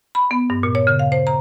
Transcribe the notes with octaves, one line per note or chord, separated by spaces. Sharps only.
B5
B3
G2
A#2
C#5
C#3
F5
C5
A#5